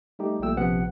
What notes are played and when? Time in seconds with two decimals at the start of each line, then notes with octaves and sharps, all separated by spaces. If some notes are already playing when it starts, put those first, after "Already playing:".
0.19 G3 A3 D#4 G4
0.40 A#1 A#2 G3 A3 G5 E6
0.56 A#1 C3 F3 B3 F#5